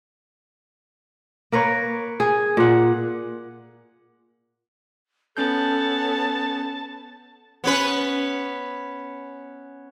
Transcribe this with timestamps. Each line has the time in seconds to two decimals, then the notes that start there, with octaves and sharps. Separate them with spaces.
1.52 A#3 A#4 B4 C#5
2.20 G#4
2.57 A#2 F#5
5.37 B3 C#4 A4 C#5 A5 G6
7.64 B3 C#4 B4